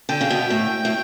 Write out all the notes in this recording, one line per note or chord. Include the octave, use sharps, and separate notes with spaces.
D3 G5
C#3
B2
A2
A2